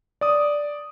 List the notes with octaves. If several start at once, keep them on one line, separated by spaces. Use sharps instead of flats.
D5 D#6